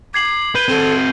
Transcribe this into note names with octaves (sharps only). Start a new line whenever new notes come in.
D6 G#6 C7 F#7
B4 G6 D#7 G7
C4 F#4 A4